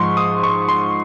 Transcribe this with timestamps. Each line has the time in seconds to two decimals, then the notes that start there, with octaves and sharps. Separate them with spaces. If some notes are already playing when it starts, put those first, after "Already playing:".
Already playing: G#2 F3 C6 C#6
0.17 D#6
0.43 C#6
0.69 C6